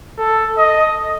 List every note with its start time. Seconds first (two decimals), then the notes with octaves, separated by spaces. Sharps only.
0.18 A4
0.58 D#5